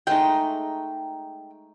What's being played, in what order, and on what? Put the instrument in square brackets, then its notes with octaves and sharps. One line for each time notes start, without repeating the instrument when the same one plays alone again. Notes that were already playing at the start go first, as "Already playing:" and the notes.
[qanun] G#3 A3 D#4 [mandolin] G5